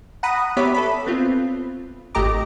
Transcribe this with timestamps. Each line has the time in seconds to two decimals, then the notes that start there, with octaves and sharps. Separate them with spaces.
0.23 F#5 A#5 B5 D#6
0.57 B3 G4 C#5 D5 E5 B5
0.74 A4 B5
1.07 B3 C4 F4
2.15 G#1 A3 G4 D#5 A#5 D6